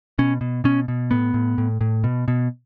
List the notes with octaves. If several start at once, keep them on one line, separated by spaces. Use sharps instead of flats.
B2 C#4
B2
B2 C#4
B2
A2 B3
A2
A2
A2
B2
B2